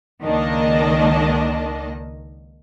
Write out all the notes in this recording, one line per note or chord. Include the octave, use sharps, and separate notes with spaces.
C#2 D#3 A#3 D4 D#5